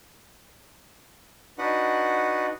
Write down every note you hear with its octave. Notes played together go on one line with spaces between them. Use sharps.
D4 D#4 F#4 B4 F#5